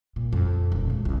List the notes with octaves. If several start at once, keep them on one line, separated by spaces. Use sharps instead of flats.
A#2
F2
D#1
G#3
C2